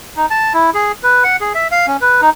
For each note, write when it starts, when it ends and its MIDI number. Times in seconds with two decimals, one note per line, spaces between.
0.17 0.26 63
0.30 0.53 81
0.54 0.70 64
0.74 0.92 68
1.03 1.24 71
1.24 1.36 78
1.41 1.53 68
1.55 1.67 76
1.71 1.86 77
1.87 1.97 61
2.01 2.21 71
2.21 2.30 63